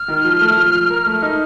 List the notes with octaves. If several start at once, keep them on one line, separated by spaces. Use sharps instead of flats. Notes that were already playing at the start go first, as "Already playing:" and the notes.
Already playing: F6
D#3
F3
A3
F3
F3
A#4
A3
D#4